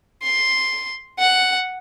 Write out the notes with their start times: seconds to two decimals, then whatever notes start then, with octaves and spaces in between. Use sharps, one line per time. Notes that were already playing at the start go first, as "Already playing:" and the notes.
0.23 C6
1.19 F#5